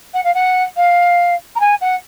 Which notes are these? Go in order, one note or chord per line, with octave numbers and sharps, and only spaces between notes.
F#5
F5
F#5
F5
A#5
G#5
F#5